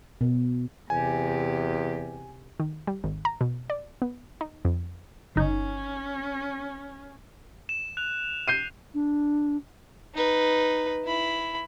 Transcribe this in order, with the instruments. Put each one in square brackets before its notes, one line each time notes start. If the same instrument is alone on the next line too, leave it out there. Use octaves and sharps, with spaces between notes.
[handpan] B2
[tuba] E2 [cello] C3 G4 [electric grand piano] G#5
[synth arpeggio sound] D#3
G3
G#1
A#5
B2
D5
B3
D#4
F2
[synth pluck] G1 D#4 [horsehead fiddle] C#4
[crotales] E7
F#6 F7
[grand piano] G6 C7 D#7
[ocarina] D4
[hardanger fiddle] D#4 B4
E4 B5